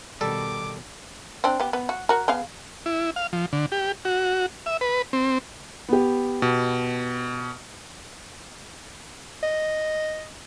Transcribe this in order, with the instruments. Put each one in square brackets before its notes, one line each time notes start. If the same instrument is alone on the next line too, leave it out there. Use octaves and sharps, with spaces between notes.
[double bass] B2 D#3 [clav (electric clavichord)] G3 A4 [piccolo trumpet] D6
[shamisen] C4 D4
B3 G4
B3
F#4
F#4 A#4
B3 G#4 F5
[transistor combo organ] E4
F5
F3
D3
G4
F#4
E5
B4
C4
[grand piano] B3 G4
[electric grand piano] B2
[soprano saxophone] D#5